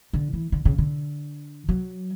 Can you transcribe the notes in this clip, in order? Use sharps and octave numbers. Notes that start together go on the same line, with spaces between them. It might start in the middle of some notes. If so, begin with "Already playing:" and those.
D3
E3
D3
C#3
D3
F#3